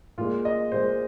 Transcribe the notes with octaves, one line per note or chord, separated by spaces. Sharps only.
A#2 G#3 F4
D#5
A#2 G#3 C5